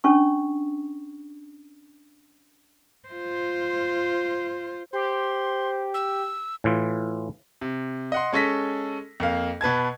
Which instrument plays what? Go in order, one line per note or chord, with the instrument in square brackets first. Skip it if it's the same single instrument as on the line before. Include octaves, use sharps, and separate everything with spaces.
[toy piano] C#4 D4 C#6
[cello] F4 C5
[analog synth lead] G4 [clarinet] C5 [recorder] C6
[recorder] E6
[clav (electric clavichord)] A2 E3 F4
[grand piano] C3
D#5 F#5 C6
G#3 C#4 A4 A#6 B6
F2 A#3 F5
B2 B4 A5 G#6